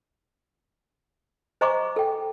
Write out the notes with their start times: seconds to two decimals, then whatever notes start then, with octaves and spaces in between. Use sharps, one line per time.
1.61 C5 D#5 G#5 A#5 C#6 D6
1.96 A4 G5